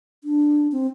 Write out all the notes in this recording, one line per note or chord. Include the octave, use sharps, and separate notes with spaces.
D4
C4